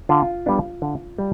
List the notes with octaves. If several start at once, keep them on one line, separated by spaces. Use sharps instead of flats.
D3 F4
G3 B3 D4
D3
G3